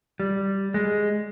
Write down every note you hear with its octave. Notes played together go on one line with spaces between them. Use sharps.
G3
G#3